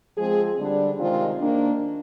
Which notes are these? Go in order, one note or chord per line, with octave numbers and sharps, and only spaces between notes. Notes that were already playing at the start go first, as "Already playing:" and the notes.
F3 G#3 C4 G#4
D3 G3 D4
C3 D#3 G#3 C4 F4
D#3 A#3 D4